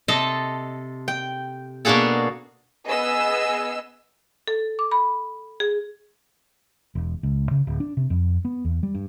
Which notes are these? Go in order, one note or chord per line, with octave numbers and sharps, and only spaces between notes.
C3 A4 D#5 A5
G5
B2 A#3 D4 F#4 G#4 A4
B3 G#4 D#5 E6
A4
D6
B5
G#4
E1
C#2
C#3
D1
D4
C3
F2
B3
E2
G3
G2